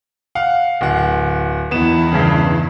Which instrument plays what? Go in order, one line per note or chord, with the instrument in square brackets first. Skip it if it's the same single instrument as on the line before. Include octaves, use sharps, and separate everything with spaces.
[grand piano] F5 F#5
D1 F#5
[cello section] E2 D#3 E4 [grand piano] B3 E7
[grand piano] G2 C#3